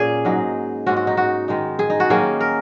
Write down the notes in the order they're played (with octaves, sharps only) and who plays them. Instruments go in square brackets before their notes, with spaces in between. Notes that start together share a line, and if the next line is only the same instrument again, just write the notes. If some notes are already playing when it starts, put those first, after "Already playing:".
Already playing: [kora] A#2 A#3 C#4 G#4
G#2 F#3 D#4
G#2 G#3 C#4 F#4
F#4
D#4
F#4
D#3 G#3 D#4
G#4
D#4
F#4
D#3 F#3 A#3 C#4 G#4
A#4